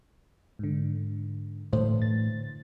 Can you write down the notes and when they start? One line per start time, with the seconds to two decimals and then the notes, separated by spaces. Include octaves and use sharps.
0.59 G#2 D3
1.73 A2 D3 E3 C5
2.02 A6